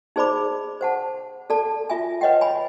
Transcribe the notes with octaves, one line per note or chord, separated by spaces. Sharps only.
D#4 G#4 C5 D5 B5 D6
C5 F#5 A5
A4 D5 A5
F4 E5 G#5
B4 C#5 D#5 F#5 G5
G#5 B5